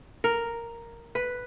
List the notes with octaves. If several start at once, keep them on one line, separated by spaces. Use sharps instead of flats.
A#4
B4